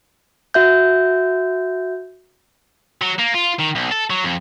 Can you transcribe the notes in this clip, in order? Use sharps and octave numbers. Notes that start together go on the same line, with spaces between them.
F#4 E5 G6
F#3
A#3
F4
D#3
B1
A4
F#3
F2